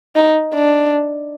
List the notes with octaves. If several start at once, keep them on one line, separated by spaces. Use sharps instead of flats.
D#4
D4